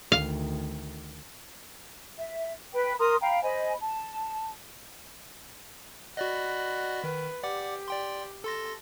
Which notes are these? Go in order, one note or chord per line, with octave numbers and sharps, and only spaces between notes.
D2 D#3 F5
E5
B4 G5 B5
A#4 A#5 C6 D#6
F5 G5 A#5 B5
C5 D#5 G#5 B5
A5
F#4 D5 D#5 F#5 B5
D#3 B4
G4 D5 F#5 D6
D5 G5 C6
A4 A5 C6 A#6